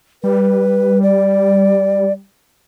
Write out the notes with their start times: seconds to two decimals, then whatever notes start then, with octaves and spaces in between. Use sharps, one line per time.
0.24 G3 B4
1.03 D5